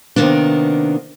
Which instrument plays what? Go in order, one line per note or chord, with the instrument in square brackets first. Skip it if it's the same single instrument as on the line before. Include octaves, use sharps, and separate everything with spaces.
[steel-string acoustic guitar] C3 D#3 A#3 B3 D4